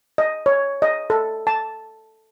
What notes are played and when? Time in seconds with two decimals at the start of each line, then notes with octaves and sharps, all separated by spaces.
0.18 D#5
0.46 C#5
0.82 D#5
1.10 A4
1.47 A5